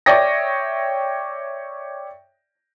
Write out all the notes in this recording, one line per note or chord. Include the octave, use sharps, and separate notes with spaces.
C#5 D5 E5 G5 D#6 A#6